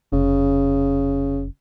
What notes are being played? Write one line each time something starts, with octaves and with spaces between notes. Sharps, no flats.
F1 C#3